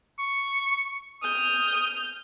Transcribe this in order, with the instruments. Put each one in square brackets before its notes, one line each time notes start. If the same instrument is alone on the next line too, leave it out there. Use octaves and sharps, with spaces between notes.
[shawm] C#6
[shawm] D#6 [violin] F6 G6